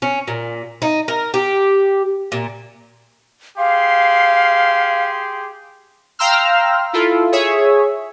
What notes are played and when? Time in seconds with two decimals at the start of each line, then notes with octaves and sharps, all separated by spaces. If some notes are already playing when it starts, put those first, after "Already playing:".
0.02 C#4
0.28 A#2
0.82 D#4
1.08 A#4
1.34 G4
2.32 A#2
3.58 G4 G#4 F5 C6
6.19 F5 G5 A#5 C6 E6 F6
6.93 E4 F4 A4
7.32 G#4 C#5 E5